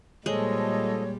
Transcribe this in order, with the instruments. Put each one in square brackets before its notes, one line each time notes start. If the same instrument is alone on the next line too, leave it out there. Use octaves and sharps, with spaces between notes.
[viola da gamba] A#2 G3 [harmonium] F3 A4 D#5 [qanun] G#3 [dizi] C#5